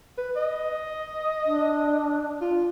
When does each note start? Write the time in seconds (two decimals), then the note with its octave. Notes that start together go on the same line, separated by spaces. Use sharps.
0.18 B4
0.36 D#5
1.46 D4
2.41 F4